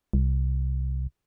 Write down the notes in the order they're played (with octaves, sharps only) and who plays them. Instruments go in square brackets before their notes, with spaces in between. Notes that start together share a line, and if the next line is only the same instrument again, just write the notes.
[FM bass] C2